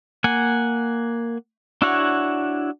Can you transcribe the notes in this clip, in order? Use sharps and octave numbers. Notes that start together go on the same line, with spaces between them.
A#3 F#5 G#5
D4 E4 F#4 C#5 F#5